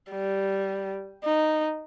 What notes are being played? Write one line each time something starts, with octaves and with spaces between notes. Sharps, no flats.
G3
D#4